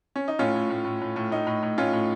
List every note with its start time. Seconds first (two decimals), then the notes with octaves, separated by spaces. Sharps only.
0.16 C#4
0.28 D#4
0.39 A2 C#4 F4
0.55 A2
0.70 A2
0.85 A2
1.01 A2
1.16 A2
1.31 A2 D#4
1.47 A2
1.63 A2
1.78 A2 C#4 F4
1.93 A2